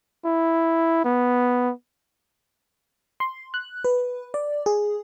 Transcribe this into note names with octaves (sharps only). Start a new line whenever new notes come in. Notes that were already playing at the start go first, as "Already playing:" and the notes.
E4
B3
C6
F#6
B4
D5
G#4